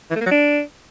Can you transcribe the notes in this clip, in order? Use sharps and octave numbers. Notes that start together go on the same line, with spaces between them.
E3
A3
A#3
F#3
D4